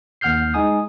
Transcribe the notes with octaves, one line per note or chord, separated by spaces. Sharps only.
D#2 F#5 F6 G6 C7
G#3 D#4 G#5 D#6